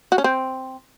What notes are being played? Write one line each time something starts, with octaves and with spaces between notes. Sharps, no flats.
F#4
C#4
C4